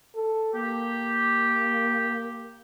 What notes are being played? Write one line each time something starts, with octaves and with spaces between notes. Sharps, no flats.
A4
A#3 G4